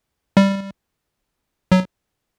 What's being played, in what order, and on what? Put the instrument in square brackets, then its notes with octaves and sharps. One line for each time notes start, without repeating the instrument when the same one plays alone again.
[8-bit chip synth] G3
F#3